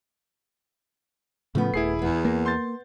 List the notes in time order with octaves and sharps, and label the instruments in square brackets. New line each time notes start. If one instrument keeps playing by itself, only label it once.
[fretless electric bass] A2 C#3 F3 [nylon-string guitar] A3 B3
[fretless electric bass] D#1 [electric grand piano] E4 G#4 C7
[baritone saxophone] E2 [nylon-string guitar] B3
[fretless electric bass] A#3
[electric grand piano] C6 G6 A6